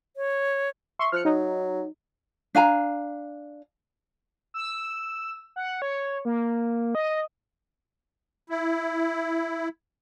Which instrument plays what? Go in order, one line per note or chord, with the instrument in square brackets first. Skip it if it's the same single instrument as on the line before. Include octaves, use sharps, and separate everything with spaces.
[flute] C#5
[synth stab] E5 C6 C#6
[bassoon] F3 [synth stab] F6 F#6 C#7
[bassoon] F#3 [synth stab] D#4
[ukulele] D4 F5 G#5 A#5
[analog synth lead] E6
F#5
C#5
A#3
D#5
[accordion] E4